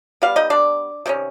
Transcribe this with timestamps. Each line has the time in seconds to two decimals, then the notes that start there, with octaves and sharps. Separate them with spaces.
0.22 G3 B3 F5
0.36 D#4 D#5
0.50 D4 D5
1.06 C3 D#3 G#3 C#4